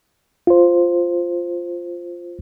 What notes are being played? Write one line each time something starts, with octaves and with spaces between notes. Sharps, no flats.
F4 C5